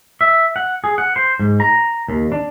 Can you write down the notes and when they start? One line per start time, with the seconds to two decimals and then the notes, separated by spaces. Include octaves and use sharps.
0.21 E5
0.56 F#5
0.84 G#4
0.98 F#5
1.16 C5
1.40 G#2
1.60 A#5
2.09 D#2
2.32 D4